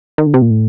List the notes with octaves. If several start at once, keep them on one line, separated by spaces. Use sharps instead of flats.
D#3
D3
C3
A#2
A2